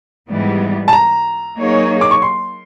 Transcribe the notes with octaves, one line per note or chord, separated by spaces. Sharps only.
G#2 E3 G3 B3
A5
A#5
F#3 A#3 D#4 G#4 C#5
D6
C#6
C6